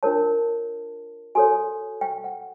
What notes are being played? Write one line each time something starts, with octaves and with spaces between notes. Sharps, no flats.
D4 F4 A#4 C#5 A5
F#4 A4 C#5 G#5
G5
F#5